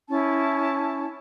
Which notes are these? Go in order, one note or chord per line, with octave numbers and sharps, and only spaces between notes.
C#4 E4 A5